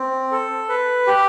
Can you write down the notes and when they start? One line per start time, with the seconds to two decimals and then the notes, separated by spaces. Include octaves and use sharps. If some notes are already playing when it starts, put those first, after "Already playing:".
Already playing: C4
0.32 A4
0.69 B4
1.07 G4